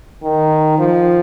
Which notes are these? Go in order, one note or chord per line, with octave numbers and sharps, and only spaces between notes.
D#3
F3